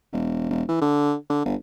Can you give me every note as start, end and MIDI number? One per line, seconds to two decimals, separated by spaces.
0.12 0.46 28
0.50 0.63 28
0.69 0.81 52
0.82 1.13 50
1.30 1.41 50
1.45 1.55 31